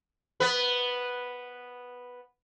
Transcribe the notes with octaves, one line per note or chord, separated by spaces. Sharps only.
B3 B4